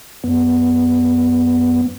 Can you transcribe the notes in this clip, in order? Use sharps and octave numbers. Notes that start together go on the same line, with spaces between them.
F#2 B3